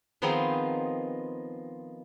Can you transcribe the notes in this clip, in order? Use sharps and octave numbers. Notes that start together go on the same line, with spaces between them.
D#3 F3 B3 C4 D#4 G#4